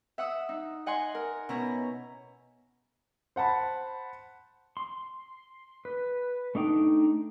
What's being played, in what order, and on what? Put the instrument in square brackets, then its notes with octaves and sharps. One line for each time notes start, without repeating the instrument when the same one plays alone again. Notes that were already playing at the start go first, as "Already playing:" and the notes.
[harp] E5 F#5 D#6 E6
D#4
D#5 F#5 G#5 C6
A#4
B2 C#4 E4 A#5
[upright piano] C5 F#5 A5 B5
[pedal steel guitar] C6
B4
A3 D4 D#4 G5